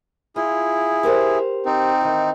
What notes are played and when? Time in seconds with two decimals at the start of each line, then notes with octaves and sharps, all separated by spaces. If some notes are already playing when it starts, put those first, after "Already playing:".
0.36 E4 F4 G#4
1.03 G4 A#4 C5
1.66 C4 D#4
2.01 D#3 E3